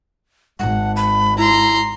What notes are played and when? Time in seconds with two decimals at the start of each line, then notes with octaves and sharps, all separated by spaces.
0.59 G#1 F#5
0.96 B5
1.38 E4 A#5 C6